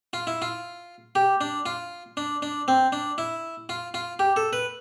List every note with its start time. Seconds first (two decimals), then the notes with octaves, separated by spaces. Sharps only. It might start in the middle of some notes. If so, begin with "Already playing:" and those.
0.13 F4
0.27 E4
0.42 F4
1.15 G4
1.41 D4
1.66 F4
2.17 D4
2.42 D4
2.68 C4
2.92 D4
3.18 E4
3.69 F4
3.94 F4
4.19 G4
4.36 A4
4.53 B4